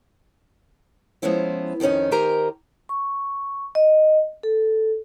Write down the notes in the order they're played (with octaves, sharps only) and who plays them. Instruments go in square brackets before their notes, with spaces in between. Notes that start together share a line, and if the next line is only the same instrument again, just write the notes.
[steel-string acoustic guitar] F3 G#3 B3 C#4 E4 C5
F2 D#3 C4 C#4 D#4
D#3 G4 A#4 C5 G#5 A#5
[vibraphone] C#6
D#5
A4